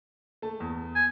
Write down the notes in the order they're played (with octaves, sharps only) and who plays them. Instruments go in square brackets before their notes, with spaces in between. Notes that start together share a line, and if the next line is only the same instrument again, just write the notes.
[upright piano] A3 A5
E2
[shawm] G#5